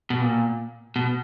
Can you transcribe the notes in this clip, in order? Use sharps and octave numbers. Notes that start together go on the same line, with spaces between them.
B2
A#2
B2